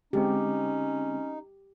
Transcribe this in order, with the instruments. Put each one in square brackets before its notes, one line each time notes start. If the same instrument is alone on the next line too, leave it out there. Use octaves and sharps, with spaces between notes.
[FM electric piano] D3 G#3 C4 [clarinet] C#4 [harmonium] D#4 [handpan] G4